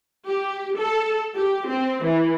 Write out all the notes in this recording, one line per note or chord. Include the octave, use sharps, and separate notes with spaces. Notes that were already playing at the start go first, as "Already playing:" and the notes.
G4
A4
G4
C4
E3